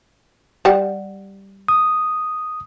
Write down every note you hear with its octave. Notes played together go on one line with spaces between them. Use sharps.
G3 F#5
D#6